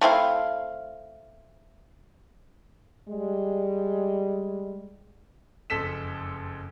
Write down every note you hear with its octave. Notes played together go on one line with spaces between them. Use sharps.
A3 C4 E4 F5
G3 G#3
F#1 F2 A4 B6 E7